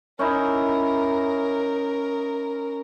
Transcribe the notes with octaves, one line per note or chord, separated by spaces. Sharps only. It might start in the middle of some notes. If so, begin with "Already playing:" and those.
C#4 D#4 E4 A#4